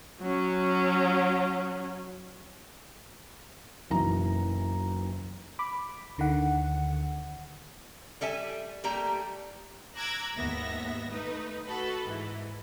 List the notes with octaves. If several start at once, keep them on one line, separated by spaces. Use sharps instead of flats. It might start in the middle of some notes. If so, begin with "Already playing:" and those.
F#3 C#4
F#1 B1 E3 A#5
B5 D6
D2 D3 D#3 F#5
G3 A4 E5 G#5
G3 A3 A#3 G4 A#5
A#5 D6 E6 F#6 G#6 A#6
D#2 G#2 B3 E5 A#6
A3 D#4 B4
F#4 A4 B4
G#2 E3